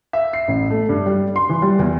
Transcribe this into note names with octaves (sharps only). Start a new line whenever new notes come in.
E5
C7
A1
A3
G2
G3
C6
E3
G3
E2